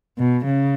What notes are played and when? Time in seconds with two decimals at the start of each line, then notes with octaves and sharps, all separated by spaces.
0.18 B2
0.45 C#3